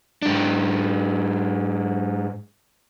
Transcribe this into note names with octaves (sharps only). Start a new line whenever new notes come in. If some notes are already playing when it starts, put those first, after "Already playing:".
G#2 D4